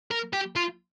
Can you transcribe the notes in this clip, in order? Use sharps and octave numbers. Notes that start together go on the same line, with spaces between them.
A#4
G4
F4